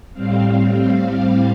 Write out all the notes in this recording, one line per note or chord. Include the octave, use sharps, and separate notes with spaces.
A2 G3 C4 F5
F5